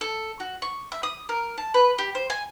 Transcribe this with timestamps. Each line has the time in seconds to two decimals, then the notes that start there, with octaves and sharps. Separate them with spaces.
0.01 A4
0.40 F#4
0.62 C#6
0.92 E5
1.03 D#6
1.29 A#4
1.58 A5
1.74 B4
1.98 G4
2.15 C5
2.30 G#5